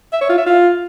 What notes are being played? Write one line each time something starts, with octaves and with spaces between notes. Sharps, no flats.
E5
C#5
F4
E5
F4